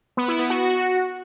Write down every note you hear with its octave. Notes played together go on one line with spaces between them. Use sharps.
B3
E4
B3
F#4